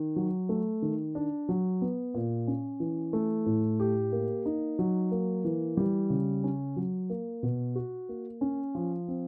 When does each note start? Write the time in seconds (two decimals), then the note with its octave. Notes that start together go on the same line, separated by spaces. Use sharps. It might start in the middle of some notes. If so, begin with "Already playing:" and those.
Already playing: D#3
0.16 F#3
0.49 A3
0.82 D#3
1.15 D4
1.49 F#3
1.82 B3
2.14 A#2
2.47 C#4
2.80 E3
3.13 A3
3.46 A2
3.80 G4
4.12 A#3
4.46 D#4
4.79 F#3
5.11 A#3
5.44 E3
5.77 G3
6.10 C#3
6.44 C#4
6.76 F#3
7.10 A#3
7.43 B2
7.76 F#4
8.09 A#3
8.41 C#4
8.75 F3
9.08 C4